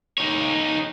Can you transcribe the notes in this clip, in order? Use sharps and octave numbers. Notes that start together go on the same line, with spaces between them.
D#4 C#5